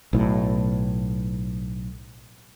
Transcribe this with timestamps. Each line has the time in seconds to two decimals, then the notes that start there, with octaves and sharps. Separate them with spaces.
0.13 B1 A2